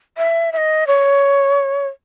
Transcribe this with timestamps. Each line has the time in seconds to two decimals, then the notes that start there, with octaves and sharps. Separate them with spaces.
0.18 E5
0.53 E5
0.57 D#5
0.87 C#5